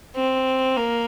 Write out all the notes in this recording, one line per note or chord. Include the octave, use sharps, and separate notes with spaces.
C4
A#3